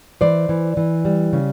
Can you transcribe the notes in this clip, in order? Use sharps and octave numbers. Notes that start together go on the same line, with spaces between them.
E3 C5 D5
E3
E3
G3
C#3